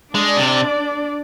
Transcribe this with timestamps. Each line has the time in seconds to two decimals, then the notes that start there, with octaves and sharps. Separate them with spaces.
0.15 G#3 D4 D5
0.37 C3